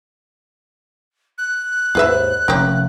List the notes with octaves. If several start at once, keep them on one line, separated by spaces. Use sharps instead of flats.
F#6
D#2 G#2 G#4 B4 E5
F1 A#3 C#4 G4